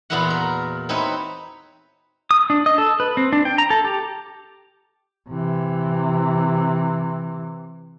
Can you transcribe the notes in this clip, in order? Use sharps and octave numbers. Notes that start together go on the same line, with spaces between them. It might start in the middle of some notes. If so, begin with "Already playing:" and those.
E2 A#2 B3 E4 F#4 F#5
A#4
C4 D#4 E4 B4 C#5
D#6
D4
D#5
A4
B4
C4
D4
G5
A#5
A4
G4
C3 E3